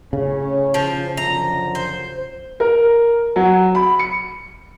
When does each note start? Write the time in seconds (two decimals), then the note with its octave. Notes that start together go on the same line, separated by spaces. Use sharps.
0.13 A2 C#3 C#4
0.74 F3
1.17 F#2 D3 F3 A#5
1.75 C5
2.60 A#4
3.36 F#3
3.75 B5
3.99 C#7